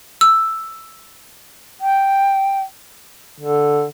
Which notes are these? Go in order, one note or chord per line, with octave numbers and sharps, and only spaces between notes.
E6
G5
D3